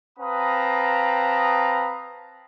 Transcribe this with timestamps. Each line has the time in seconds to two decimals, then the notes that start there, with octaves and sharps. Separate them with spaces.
0.19 C4 B4 F5 A5 A#5 D#6